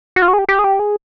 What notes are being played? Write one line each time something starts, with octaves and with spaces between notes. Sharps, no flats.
F#4
F4
F#4
G#4
G4
G4
G#4
G4
G#4